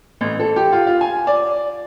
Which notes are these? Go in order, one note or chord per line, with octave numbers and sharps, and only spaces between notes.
A1
A4
G4
F4
F4
G#5
D5